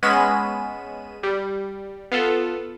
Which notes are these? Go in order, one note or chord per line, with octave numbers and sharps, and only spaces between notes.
G#3 B3 C#4 B5 D#7 E7
G3
B3 F4 A4